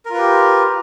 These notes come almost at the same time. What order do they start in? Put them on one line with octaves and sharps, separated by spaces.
A#4 F4 B4 G4